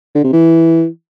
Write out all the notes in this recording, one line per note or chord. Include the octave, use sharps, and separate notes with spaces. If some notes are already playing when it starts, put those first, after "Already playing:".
D3
C3
E3